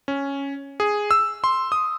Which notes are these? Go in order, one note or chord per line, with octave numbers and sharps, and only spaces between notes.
C#4
G#4
E6
C6
D#6